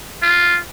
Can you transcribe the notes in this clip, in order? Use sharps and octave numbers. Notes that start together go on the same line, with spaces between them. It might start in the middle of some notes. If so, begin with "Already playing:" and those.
F4